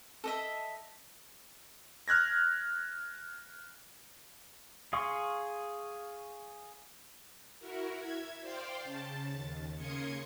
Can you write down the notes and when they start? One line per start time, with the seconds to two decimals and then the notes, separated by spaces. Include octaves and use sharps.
0.24 A4 D#5 E5
2.08 F6 F#6 G#6 A#6
4.93 G#4 F5 C6 C#6 D#6
7.60 E4 F#4 A#4
7.96 E5 G#6
8.40 C5 D5 F5 G5 C6
8.80 C#3 A5 A6
9.31 D#2
9.76 C#3 A#3 C6 D#6 G#6 C#7